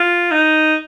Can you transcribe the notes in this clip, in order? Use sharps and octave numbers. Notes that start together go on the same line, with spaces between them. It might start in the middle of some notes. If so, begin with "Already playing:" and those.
Already playing: F4
D#4